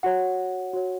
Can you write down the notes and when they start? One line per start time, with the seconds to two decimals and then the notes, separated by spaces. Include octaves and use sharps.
0.03 F#4 C#5 F#5
0.73 F#4 C#5